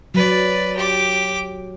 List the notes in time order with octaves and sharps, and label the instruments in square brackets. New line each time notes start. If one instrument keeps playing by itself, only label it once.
[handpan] F#3 [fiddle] B4 D5
[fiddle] G4 D6